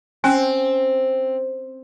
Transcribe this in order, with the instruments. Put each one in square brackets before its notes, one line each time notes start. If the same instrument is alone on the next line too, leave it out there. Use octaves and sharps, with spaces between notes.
[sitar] C4 [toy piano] C#4 G#5